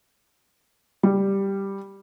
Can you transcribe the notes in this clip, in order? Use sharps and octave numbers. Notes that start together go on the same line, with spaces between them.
G3